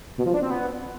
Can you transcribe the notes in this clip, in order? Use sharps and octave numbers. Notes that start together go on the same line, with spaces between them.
B2
F3
D4
C4
B3